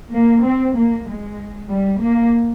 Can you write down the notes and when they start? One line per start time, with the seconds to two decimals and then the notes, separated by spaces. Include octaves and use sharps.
0.13 A#3
0.45 C4
0.77 A#3
1.08 G#3
1.71 G3
2.03 A#3